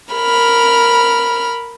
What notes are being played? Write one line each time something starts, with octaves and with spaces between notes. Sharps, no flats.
A#4 B5 F6